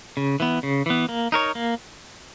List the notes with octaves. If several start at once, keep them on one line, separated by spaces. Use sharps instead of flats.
C#3
E3 B3
C#3
E3 B3
A#3
D#4 A#4 C#5
A#3